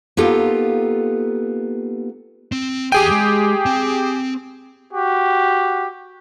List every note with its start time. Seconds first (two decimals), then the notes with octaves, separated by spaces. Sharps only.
0.17 A#3 B3 D#4 F4 G4 A4
2.52 C4
2.92 E2 G4 G#4 G5 G#5
3.11 G#3
3.66 C4
4.93 F#4 G4